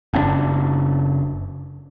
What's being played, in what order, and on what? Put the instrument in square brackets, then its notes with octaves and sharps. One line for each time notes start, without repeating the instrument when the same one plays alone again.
[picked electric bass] F#1 C4 D4